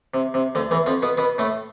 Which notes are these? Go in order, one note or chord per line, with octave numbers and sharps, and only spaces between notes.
C3
C3
D2 D3
E2 E3
F2 F3
B2 B3
B2 B3
A2 A3